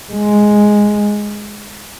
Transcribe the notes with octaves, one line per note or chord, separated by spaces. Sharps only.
G#3